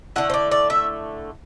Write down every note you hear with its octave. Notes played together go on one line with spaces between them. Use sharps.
D3 A3 E4 F#5
C5
D5
D5
E5